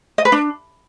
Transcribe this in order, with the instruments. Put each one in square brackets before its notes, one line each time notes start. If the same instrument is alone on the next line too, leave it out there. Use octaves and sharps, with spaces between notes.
[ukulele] D#5
B4
D4